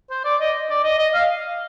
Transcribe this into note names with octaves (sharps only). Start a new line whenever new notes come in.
C5
D5
D#5
D5
D#5
D#5
F5